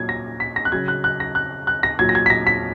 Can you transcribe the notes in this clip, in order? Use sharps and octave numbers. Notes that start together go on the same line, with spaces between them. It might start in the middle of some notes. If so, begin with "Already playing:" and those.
Already playing: A#2 F#3 G#6
A#6
B6
A#6
F#6
C#3 F#3 G#6
F#6
F#6
A#6
F#6
F#6
A#6
A#2 F#3 G#6
A#6
G#6
B6
A#6
B6